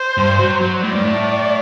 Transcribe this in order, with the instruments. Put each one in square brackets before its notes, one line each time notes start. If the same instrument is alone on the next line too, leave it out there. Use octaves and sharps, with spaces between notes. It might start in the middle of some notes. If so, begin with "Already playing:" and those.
Already playing: [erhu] C5
[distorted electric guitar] G2
F#3
F#3
[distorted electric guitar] A2 [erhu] D5
[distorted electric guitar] G2
A2